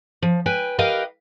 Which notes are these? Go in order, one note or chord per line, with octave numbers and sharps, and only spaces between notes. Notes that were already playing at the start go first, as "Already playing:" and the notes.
F3
B4 G5 G#5
G4 A#4 B4 D#5 F5 G5